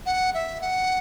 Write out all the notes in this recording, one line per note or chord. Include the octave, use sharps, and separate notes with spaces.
F#5
E5
F#5